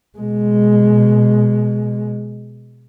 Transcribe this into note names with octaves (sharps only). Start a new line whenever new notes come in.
B2 G#3